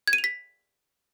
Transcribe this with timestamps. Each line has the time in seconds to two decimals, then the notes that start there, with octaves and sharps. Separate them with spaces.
0.08 G#6
0.13 D#7
0.18 F7
0.24 B6